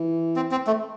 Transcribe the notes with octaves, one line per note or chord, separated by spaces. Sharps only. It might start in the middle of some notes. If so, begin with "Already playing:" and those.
Already playing: E3
C4
C4
A3